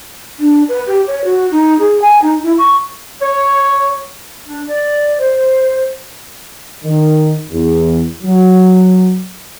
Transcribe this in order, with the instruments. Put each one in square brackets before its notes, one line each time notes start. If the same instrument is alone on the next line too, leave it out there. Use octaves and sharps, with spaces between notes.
[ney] D4
B4
G4
C#5
F#4
D#4
G#4
G#5
D#4
E4
C#6
[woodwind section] C#5
D4
D5
C5
[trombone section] D#3
E2
F#3